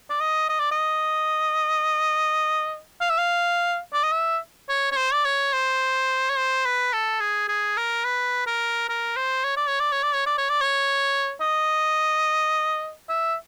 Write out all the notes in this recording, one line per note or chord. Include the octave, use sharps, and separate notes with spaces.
D5
D#5
D#5
D5
D#5
F5
E5
F5
D5
D#5
E5
C#5
C#5
C5
D5
C#5
C5
C#5
C5
B4
A4
G#4
G#4
A#4
B4
A#4
A#4
C5
C#5
D5
C#5
D5
C#5
D5
C#5
D5
C#5
D5
C#5
D#5
E5